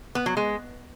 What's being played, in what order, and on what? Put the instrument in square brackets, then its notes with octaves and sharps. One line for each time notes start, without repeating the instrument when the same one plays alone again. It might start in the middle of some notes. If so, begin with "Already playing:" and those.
[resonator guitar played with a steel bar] B3
F#3
G#3